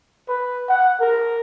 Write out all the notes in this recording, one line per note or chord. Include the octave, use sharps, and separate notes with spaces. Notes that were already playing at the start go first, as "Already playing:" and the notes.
B4
F#5
A#4